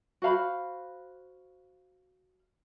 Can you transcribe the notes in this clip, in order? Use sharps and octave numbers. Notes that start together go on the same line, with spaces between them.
F#4 C5 F5 B5